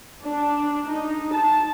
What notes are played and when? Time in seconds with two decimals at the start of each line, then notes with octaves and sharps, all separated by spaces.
0.21 D4
0.85 D#4
1.33 A5